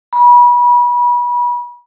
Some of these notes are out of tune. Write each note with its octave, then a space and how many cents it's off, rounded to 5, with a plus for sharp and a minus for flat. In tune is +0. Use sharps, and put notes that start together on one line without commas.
B5 -30